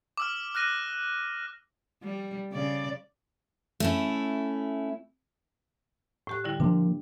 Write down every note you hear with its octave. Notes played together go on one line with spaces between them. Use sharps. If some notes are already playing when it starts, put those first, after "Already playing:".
D6 E6 F6
F6 F#6 A#6 D#7
G3
C#3 D5
A3 C#4 E4
A2 G4 F#6
D3 G3 E4
D3 F3 A#3 D4